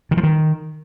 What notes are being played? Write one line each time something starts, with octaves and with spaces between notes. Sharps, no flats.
D#3
F3
D#3